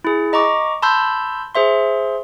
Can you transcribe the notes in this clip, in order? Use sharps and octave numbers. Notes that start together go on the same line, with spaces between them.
E4 G#4
D#5 A#5 C#6 D6
A5 B5 C6 E6 G6
G#4 C5 E5 C6